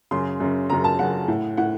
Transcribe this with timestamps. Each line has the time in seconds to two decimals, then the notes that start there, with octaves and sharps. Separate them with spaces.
0.11 F#2 C#3 C6
0.40 F#2 C#3
0.70 F#2 C#3 A#5
0.84 A5
0.99 F#2 C#3 F#5
1.28 A2
1.57 A2 F#5